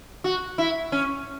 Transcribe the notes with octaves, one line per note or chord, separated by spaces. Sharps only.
F#4
E4
C#4